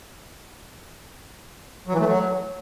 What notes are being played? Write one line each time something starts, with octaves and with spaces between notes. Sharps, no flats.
F#3
E3
A3
F#3